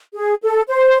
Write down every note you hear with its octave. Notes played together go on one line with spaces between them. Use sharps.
G#4
A4
C5